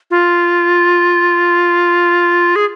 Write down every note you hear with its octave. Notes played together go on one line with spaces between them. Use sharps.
F4
G#4